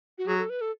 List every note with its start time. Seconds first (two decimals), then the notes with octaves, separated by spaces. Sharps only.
0.18 F#4
0.27 F#3 G#4
0.38 A4
0.50 B4
0.61 A4